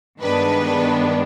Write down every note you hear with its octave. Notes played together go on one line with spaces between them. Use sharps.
G2 D#3 G#3 B3 D4 B4